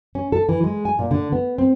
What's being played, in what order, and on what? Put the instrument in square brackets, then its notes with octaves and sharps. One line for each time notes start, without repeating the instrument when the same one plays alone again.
[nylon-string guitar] C#4
A4
E3
G#3
G#5
A#2
D3
B3
C4